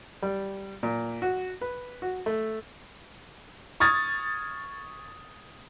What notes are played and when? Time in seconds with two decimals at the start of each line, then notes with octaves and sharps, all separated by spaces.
0.22 G3
0.83 A#2
1.22 F#4
1.61 B4
2.02 F#4
2.26 A3
3.80 C#6 D#6 F6 G#6 A6